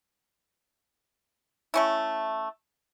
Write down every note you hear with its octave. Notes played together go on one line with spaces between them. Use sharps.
A3 C#4 E4